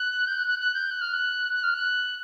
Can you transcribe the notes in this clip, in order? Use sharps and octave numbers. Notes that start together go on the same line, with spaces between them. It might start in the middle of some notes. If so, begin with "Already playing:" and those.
Already playing: F#6
G6
F#6
F#6
F#6
G6
F#6
F6
F#6
F#6
F6
F#6